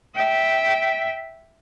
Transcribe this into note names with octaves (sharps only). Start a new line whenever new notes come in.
E5 G5